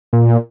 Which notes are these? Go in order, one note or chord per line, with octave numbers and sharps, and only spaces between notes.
A#2